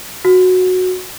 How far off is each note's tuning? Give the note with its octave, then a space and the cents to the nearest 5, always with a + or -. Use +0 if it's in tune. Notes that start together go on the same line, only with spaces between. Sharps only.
F#4 -10